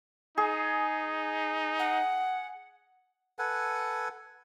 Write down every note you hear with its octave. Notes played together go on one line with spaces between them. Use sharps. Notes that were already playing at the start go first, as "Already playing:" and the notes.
D#4 G#4
F#5
A4 B4 F#5 G#5